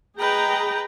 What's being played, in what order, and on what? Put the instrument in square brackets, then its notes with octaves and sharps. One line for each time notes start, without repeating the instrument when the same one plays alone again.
[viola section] G#4 G5 A#5 [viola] B4 D#5